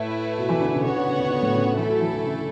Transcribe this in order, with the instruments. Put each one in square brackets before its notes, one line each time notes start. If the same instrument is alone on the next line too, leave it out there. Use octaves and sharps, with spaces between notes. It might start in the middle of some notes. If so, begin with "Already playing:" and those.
Already playing: [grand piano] A2 [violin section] A3 E4 B4
[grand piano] B2
E3
D3
C#3
[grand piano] C#3 [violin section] B3 F#4 C#5 F#5
[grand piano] D3
C#3
D3
D3
A2
C#3
D3
[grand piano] E3 [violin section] A3 E4 A4
[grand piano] F#3
E3
D3
C#3